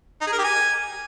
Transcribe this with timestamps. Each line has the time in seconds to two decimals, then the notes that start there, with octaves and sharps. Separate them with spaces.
0.21 D#4
0.27 G#4
0.33 A#4
0.38 G4
0.44 G#5